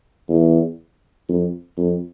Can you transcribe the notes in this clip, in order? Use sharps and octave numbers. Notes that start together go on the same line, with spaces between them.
E2
F2
F2